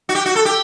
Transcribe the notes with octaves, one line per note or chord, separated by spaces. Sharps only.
F#4
G4
F#4
A4
G4